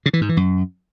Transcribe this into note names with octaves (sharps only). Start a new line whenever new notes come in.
C#3
E3
G#2
E3
F#2